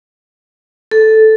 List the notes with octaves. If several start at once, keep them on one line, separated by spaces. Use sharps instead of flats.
A4